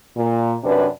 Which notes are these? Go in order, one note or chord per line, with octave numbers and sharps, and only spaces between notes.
A#2
F#2 C3 D4 B4